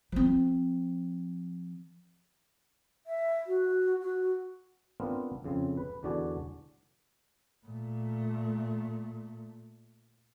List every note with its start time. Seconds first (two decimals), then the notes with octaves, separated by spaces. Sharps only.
0.12 F3 C4
3.07 E5
3.46 F#4
4.01 F#4
5.00 B3 C4 D4 F4 A#4
5.44 F2 C#3 C4
5.77 B4
6.03 E2 D3 F#4 D5 G#5 A5
7.67 A#2 A3